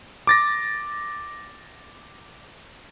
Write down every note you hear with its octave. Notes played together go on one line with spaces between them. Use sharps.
D6 A6 A#6